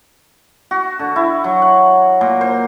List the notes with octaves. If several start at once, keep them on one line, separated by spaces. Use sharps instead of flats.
F#4
D3
E4
F#3
F#5
A#2
C5